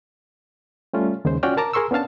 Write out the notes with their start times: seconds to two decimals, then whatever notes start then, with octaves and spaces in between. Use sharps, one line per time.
0.93 G3 A3 C#4 F4
1.25 D#2 C#3 G#3 C5
1.43 C#4 F4 F#4 D5 G5 F6
1.57 A#4 A5 A#5 D6
1.73 G#4 A#4 C6 C#6 E6
1.91 B3 C#4 D4 F5 A5